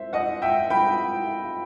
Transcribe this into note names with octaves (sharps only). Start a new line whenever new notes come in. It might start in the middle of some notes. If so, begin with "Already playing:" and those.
Already playing: C5 E5
D#5 F#5
E5 G5
G5 B5